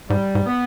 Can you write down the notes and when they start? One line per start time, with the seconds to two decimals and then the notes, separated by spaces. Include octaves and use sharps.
0.10 G#2 G3
0.35 G#2
0.46 B3